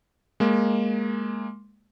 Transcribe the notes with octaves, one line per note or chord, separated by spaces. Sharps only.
G#3 A#3